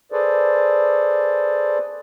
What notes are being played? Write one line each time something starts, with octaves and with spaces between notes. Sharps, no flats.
G#4 A4 B4 C5 D5